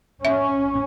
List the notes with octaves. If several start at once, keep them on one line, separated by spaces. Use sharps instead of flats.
C#4 E5